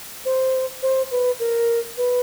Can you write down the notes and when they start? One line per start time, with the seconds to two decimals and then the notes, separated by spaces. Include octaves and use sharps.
0.25 C5
0.82 C5
1.11 B4
1.40 A#4
1.98 B4